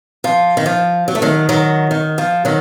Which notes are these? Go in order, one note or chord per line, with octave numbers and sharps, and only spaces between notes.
F3
D#3
F3
F#3
A3
D#3 F#3
D#3 F#3
D#3
F3
D#3 F#3